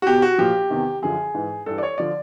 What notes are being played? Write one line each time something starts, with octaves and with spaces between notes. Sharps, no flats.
F#4
E2 B2 G4
F#4
A#2 F3 G4
E2 C3 D#3
F#2 D3 F3 G#4
G#2 E3
G2 E3 A4
D5
C#5
D3 F3 D5